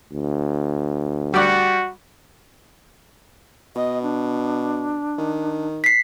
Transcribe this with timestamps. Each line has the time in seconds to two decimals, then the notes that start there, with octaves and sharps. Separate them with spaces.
0.12 D2
1.34 G3 F#4 D5 F#5
3.76 B2 D#5
4.03 D4
5.18 D#3
5.84 B6 C7